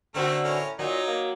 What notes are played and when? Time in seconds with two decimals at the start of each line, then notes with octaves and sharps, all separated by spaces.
0.14 D3 A3 C4 F#4 A#4
0.44 A2 C#4 A#4
0.79 A#2 F#3 D#4
1.08 A#3